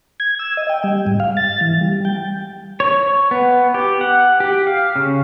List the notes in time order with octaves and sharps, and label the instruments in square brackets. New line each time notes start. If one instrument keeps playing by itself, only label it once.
[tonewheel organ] G#6
E6
D#5
G5
G3
G#2
F5
A6
E3
G3
G5
[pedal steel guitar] C#5
B3
G4
F#5
G4
F5
C#3